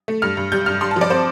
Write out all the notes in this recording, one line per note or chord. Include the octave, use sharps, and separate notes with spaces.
A3
G2 F6
G2
G3 G6
G2 F6
G2 C6
A5
F3
D5
C4 C5